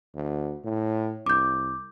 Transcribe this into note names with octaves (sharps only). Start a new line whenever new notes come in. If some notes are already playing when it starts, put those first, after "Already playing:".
D2
A2
C2 D6 G6